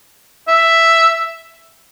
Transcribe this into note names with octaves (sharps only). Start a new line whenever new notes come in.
E5